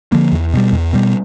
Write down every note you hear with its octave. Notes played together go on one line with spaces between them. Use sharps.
D3 F3 A#3
E2
B2 G3
E2
B2 G3